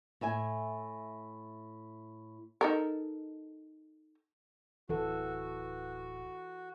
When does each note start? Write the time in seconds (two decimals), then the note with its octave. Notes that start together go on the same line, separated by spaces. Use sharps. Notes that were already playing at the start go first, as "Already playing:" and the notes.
0.21 A2 E5 G#5
2.61 D#4 A4 A#4
4.89 D1 E3 F#4 A4